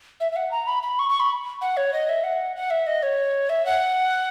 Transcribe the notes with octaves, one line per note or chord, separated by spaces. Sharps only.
E5
E5
F#5
A#5
B5
B5
C#6
C#6
B5
F#5
C#5
D#5
E5
F#5
F#5
E5
D#5
C#5
E5
F#5